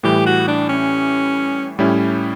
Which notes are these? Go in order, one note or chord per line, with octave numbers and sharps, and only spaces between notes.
A2 E3 G3 G4
F#4
D4
C#4
A2 G3 C#4 E4